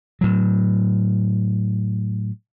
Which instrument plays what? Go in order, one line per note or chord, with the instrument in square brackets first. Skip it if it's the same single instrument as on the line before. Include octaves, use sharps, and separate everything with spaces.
[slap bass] A2 F#3